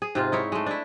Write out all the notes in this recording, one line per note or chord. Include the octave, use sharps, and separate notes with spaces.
G#4
G#2 C3 F4
D#4 E4 C#5
G#3 A3
D4 E4